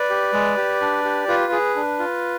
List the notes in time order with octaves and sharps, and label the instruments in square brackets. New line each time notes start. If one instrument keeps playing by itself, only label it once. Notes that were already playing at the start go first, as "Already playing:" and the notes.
Already playing: [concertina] B4 D5
G4
G#3
G4
D4
G4
F4 B4
G#4
D4
F4